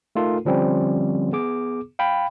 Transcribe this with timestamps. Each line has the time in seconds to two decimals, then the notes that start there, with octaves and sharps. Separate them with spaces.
0.16 A3 D#4 F4 A4 A#4
0.45 D3 F3 G3 C4 C#4
1.32 B3 G#4 D6
1.99 F5 G5 B5